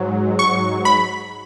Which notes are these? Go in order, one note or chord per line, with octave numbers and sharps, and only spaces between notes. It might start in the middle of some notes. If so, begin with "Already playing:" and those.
Already playing: G#2 F#3
C#6
B5